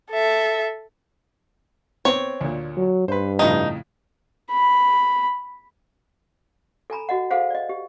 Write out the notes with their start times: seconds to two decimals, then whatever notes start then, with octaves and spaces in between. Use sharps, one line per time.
0.11 A4 E5
2.05 B3 C4 C#5
2.41 D2 A#2
2.77 F#3
3.08 G2 B4 C5
3.39 F2 A2 C#3 D#4
4.52 B5
6.90 A4 G#5 A#5 B5
7.09 F#4 D#5 F#5
7.31 G#4 A4 C5 F5 F#5
7.50 D5 D#5
7.69 G4